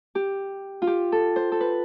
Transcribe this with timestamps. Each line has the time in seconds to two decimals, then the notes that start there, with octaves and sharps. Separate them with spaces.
0.15 G4
0.82 F4
0.87 G4
1.12 A4
1.36 C5
1.52 A4
1.60 B4